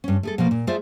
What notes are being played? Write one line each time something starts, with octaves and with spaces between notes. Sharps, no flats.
G2 C#4
A3 G#4 A4
B2 F3 A3 A#3
A#2
A3 F4 G#4 C5 D5 E5